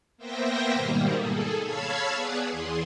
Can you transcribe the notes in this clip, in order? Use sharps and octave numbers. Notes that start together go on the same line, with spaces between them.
A#3 B3 C5 E5 G5 A#6
G#2 B2 D#3 G3 A#3
G#4 A4
C#5 F5 A5 B5 E6 G#6
B3 G#4 B4 D5 F#5
E2 E3 G#4 C6